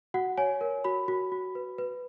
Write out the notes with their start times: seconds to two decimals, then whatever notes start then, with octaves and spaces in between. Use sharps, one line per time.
0.14 F#4 F#5
0.38 C#5 G#5
0.61 A#4
0.84 F#4 B5
1.08 F#4
1.32 F#4
1.55 B4
1.78 B4